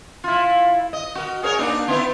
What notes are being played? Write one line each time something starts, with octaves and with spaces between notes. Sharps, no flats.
E4 F4
D#5
F#4 A#4
G#4 A#4 C#5
A#3 D4 D#4
B3 D#4 E4